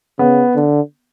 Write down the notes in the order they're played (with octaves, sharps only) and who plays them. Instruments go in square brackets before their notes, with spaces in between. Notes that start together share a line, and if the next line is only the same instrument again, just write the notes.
[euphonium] C#3 [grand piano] B3
[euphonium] D3